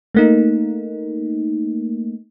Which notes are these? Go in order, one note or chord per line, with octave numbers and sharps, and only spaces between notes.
A3 A#3 D#4